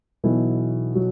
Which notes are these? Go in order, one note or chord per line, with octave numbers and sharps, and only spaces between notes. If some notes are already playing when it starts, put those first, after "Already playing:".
B1 B2 E3 F#3 E4
F#3 F#4